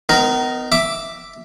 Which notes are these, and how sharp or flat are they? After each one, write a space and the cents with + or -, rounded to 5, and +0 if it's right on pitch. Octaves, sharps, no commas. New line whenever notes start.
B3 +40 D#4 -5 A#4 +0
E5 +0 D6 +0